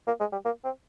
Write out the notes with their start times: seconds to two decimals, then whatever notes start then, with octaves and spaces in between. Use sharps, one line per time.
0.07 A#3
0.20 G#3
0.32 G3
0.45 A#3
0.64 C4